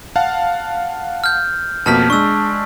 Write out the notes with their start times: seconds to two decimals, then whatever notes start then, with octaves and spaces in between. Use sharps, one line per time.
0.16 F5 F#5 A5
1.24 F6 G6
1.86 F2 B2 A#3 A5 F6 B6
2.10 G#3 D4 C#6 E6